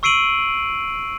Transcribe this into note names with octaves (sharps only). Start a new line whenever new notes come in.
C#6 E6 C7 D7 D#7 F#7